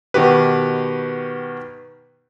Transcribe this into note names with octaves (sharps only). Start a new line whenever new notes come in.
B2 D#3 F#4 G4 B4